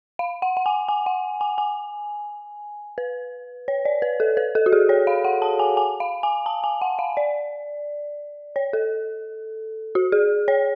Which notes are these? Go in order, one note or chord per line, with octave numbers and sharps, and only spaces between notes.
F5
F#5
F#5
G#5
G#5
F#5
G#5
G#5
B4
C#5
D5
B4
A4
B4
A4
F#4
G#4
C#5
F5
F#5
A5
G#5
G#5
F5
G#5
A5
G#5
F#5
F5
D5
C#5
A4
F#4
G#4
C#5